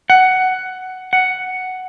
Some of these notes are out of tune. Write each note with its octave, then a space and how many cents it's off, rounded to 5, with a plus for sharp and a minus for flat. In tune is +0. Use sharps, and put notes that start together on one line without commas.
F#5 +10
F#5 +5